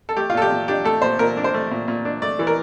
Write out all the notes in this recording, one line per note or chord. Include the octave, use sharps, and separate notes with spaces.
A4
A3 G4
F4
A#2 A4
G4
A#2
D4 G4
A3 A4
A#2 C5
A#2 A#4
D4
C5
A3
A#2
A#2
D4
A3 D5
E3
A#4